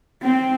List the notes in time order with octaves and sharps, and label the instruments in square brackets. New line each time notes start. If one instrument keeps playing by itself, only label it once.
[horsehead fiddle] C4